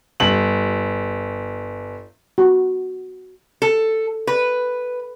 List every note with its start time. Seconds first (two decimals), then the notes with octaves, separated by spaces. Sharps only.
0.20 G1 F#7
2.38 F#4
3.62 A4
4.27 B4